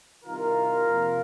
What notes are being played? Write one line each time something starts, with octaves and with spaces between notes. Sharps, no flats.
C2 C3 D#3 F4 A#4
F2 C3 F3 A#3